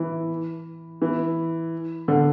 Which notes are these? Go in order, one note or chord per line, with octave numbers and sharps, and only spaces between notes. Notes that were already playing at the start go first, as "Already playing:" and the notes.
Already playing: E3
E3
D3